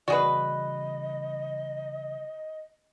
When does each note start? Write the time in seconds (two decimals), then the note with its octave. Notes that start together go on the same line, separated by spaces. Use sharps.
0.08 C#3 E3 G3 F#4 G#4 B4 D5 D#5